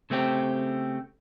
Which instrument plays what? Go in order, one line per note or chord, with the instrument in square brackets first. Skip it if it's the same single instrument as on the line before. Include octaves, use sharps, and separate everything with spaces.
[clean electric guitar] C#3 A3 C4 G4